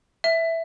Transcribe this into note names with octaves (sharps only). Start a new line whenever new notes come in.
E5